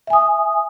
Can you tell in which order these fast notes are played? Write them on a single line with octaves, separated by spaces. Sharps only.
E5 G#5 D#6